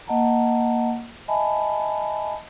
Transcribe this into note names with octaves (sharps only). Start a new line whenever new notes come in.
A#3 D#5 F#5 A5 A#5
D#5 E5 G#5 A5 B5